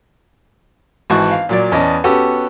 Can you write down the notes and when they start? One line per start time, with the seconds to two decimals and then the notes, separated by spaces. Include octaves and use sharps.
1.10 G#1 E3 F#4 A5 C#6 F#6
1.32 F5
1.49 A#2 F#3 D5
1.72 E2 C#4 D5 D#5 A5
2.04 B3 C#4 F#4 G4 A4